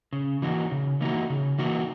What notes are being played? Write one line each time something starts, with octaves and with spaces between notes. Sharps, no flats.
C#3
E3 A#3 D#4 F#4
C#3
E3 A#3 D#4 F#4
C#3
E3 A#3 D#4 F#4